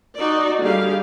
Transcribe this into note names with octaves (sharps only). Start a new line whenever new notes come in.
D#4 F#4 D5
D3 G3 G4 G#4 F5